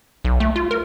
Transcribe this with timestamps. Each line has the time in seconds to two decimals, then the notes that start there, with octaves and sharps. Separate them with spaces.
0.25 B1
0.40 A3
0.56 F4
0.71 A#4